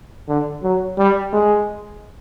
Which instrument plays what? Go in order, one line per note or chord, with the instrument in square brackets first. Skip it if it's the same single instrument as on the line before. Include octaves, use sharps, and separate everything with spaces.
[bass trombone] D3
F#3
G3
G#3